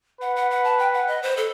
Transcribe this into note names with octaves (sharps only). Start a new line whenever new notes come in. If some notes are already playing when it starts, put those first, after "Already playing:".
B4 F#5
F#5
F#5
A5
G5
F#5
D#5
C5
A4